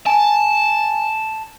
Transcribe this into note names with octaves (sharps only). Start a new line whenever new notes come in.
G#5 A5